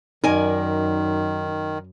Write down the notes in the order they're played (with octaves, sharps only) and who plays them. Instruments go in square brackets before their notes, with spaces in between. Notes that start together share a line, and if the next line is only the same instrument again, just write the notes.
[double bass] F#2 [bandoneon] D#3 [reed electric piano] D#4 [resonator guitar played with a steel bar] A#4 D5 G#5